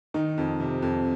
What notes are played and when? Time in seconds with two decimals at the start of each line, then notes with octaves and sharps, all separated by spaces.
0.14 D#3 D#4
0.38 F2
0.60 C3
0.82 F2